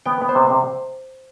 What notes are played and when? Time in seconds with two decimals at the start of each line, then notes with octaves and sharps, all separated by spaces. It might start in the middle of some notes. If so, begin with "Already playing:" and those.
0.06 B3 G5
0.22 B3
0.29 C5
0.35 C3
0.50 C3